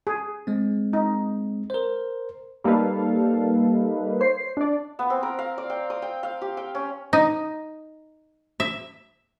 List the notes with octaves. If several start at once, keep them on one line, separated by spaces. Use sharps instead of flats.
G#4
G#3 C4
D#4
A#4 C5
G3 A#3 D#4 A4 B4 F5
C5 C#5 C7
D4 D5
B3
C4
A#4
F5
D5
G5
D#6
G5
F5
G4
G5
C#4
D#4
E5